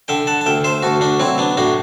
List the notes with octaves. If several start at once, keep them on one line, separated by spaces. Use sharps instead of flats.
D3 E5 G5
F#5 A5
A5
D2 E5 G5
C5 E5
D2 F#4 A4
D4 F#4
F#3 C4 E4
B3 D4
A2 D4 F#4